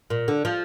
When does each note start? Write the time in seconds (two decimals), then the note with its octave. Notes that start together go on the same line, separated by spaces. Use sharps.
0.10 A#2
0.28 D3
0.45 F3